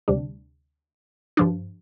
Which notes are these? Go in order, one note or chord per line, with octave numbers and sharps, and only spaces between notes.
D2 C3 G3 D4
G2 F3 D4